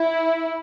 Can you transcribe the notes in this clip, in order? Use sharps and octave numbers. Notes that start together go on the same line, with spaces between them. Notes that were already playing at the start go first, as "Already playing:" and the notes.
Already playing: E4